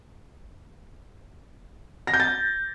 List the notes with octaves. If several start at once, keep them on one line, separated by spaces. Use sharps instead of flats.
A#6
G6
A6